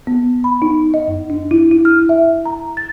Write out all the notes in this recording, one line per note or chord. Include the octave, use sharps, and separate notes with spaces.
B3
B5
D#4
D#5
F#2
D4
E4
E4
F6
E5
A#5
A6